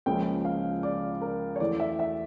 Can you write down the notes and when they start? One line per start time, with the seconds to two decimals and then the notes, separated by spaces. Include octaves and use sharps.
0.06 C#2 C#3 F3 A#3 C#4 G5
0.45 F5
0.83 D5
1.22 A#4
1.56 C#5
1.60 E2 E3 A3 D5
1.80 E5
1.99 E5